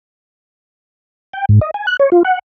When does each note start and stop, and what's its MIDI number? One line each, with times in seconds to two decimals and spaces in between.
1.33 1.45 79
1.49 1.59 44
1.61 1.71 75
1.74 1.86 80
1.87 1.97 90
2.00 2.10 73
2.12 2.23 65
2.25 2.39 78